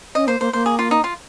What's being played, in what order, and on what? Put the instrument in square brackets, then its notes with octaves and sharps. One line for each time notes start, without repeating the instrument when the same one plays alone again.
[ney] C#4 [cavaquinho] D#5
[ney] A#3 [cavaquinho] C5
[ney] A#3 [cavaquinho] C5
[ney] A#3 [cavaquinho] C5
[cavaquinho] G#4
F4
D#4
F4